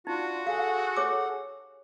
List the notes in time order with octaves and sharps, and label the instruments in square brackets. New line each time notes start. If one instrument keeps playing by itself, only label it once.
[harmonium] D4 F4 [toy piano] D#4 [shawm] F#4
[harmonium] G#4 A4 F#5 [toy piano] F5
[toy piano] G4 C#5 D6